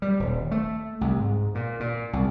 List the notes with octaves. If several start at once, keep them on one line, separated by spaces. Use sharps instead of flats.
G3
D#1
A3
C2
G#2
A#2
A#2
C2